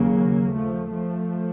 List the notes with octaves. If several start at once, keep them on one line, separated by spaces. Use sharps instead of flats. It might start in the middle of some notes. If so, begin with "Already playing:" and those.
Already playing: D#2 C#3 F#3 A#3
F3 A3
F3 A3